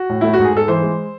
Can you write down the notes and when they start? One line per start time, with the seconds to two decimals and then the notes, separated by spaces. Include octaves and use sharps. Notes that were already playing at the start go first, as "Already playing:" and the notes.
Already playing: F#4
0.09 A2
0.21 A3 E4
0.33 G#2 F#4
0.45 G#4
0.53 G#2 A4
0.68 E3 C5
0.82 G#3